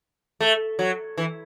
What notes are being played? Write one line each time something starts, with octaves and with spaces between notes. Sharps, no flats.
A3
F#3
E3